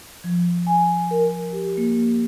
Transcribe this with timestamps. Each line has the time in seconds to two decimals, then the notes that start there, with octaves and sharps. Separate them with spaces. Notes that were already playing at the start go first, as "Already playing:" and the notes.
0.24 F3
0.67 G#5
1.11 A#4
1.53 G4
1.77 A#3